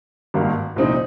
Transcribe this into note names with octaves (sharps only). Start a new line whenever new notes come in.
G#1 G2 D#3 A#3
C2 A#2 F3 C4 D#4